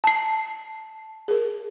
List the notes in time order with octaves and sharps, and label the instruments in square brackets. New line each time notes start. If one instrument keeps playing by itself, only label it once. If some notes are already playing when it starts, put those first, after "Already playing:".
[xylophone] A5 C7 [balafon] A#5
[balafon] G#4 A#4